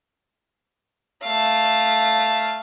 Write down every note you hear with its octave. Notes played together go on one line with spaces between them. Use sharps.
A3 F5